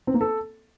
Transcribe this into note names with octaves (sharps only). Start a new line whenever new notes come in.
C4
A#3
A4